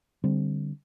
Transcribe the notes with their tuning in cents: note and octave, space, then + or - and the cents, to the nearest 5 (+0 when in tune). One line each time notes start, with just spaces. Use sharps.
D3 +0 G3 +0 C4 +0